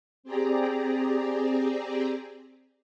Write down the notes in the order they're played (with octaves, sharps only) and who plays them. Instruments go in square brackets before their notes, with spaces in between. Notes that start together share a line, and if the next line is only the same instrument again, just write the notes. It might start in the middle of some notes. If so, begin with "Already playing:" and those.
[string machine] C4 G4 G#4 D5 A#5